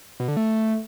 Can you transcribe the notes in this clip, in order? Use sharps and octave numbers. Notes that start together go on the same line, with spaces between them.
B2
D3
A3